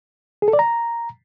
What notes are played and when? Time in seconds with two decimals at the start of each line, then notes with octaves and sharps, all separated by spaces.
0.42 G#4
0.48 A4
0.53 D5
0.59 A#5